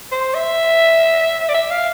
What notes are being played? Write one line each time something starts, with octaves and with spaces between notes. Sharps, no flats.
C5
E5
D5
E5
F5